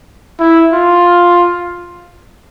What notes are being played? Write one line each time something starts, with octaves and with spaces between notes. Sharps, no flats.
E4
F4